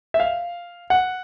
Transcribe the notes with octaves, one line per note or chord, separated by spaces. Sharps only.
E5
F5
F#5